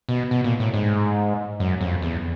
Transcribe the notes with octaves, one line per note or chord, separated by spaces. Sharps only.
B2
B2
A#2
A2
G#2
F#2
F2
E2